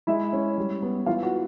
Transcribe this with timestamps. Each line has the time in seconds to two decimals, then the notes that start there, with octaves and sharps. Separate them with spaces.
0.07 G#3 E4 E5
0.33 C#4
0.58 G3
0.82 B3
1.06 E3 F4 F5
1.23 F#4 F#5